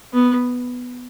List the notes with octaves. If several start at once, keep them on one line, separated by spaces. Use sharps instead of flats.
B3